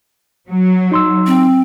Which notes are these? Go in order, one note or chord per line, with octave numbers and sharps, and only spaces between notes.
F#3
D#4 C6 E6
C4